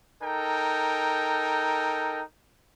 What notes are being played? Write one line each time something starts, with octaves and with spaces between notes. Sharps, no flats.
D#4 A4 A#4 G5